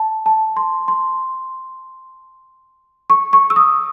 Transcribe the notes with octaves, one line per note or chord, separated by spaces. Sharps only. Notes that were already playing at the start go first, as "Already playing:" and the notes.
Already playing: A5
A5
C6
C6
C#6
C#6
E6
D#6